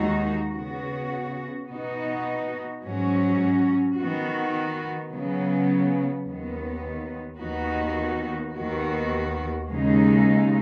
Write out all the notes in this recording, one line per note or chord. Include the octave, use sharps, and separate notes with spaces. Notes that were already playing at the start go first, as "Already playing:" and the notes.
Already playing: D#2 D#3 G#3 D#4 F#4
C#3 B3 F#4
B2 B3 D#4 F#4
G#2 F#3 C#4 F#4
D#3 B3 F#4
C#3 F#3 B3
D#2 D#3 B3
D#2 D#3 B3 D#4 F#4
D#2 D#3 B3 F#4
D#2 C#3 G#3 D#4